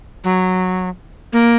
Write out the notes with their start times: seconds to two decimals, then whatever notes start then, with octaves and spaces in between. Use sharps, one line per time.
0.24 F#3
1.33 A#3